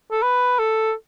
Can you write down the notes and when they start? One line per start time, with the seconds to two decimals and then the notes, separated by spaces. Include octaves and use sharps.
0.11 A4
0.22 B4
0.59 A4